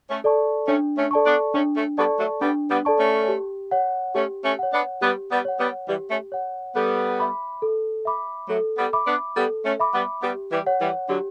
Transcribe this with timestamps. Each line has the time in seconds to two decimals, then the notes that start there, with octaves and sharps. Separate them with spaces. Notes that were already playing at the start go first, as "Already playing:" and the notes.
0.10 A3 C#4
0.24 A4 D5 A5 C#6
0.68 A3 C#4 D4
0.97 A3 C#4
1.11 A4 D5 A5 C#6
1.26 B3 D4
1.54 A3 C#4 D4
1.76 A3 C#4
1.98 G3 B3 A4 D5 A5 C#6
2.20 F#3 A3
2.41 G3 B3 D4
2.70 G3 B3
2.85 A4 D5 A5 C#6
2.99 A3 C#4
3.28 G4
3.71 C#5 F#5
4.15 A3 C#4 G4
4.44 A3 C#4
4.59 C#5 F#5
4.73 B3 D4
5.01 G3 B3 G4
5.31 G3 B3
5.45 C#5 F#5
5.60 G3 B3
5.88 E3 G3 G4
6.10 A3 C#4
6.32 C#5 F#5
6.76 G3 B3 A4
7.19 E5 B5 D6
7.62 A4
8.05 E5 B5 D6
8.49 F#3 A3 A4
8.78 G3 B3
8.93 E5 B5 D6
9.07 B3 D4
9.36 G3 B3 A4
9.65 A3 C#4
9.79 E5 B5 D6
9.94 G3 B3
10.23 G3 B3 G4
10.52 E3 G3
10.66 C#5 F#5
10.81 E3 G3
11.09 D3 F#3 G4